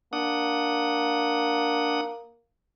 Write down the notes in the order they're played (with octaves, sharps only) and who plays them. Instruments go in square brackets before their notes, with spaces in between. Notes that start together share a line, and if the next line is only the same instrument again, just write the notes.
[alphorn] A#3 [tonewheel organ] D4 F#5 D#6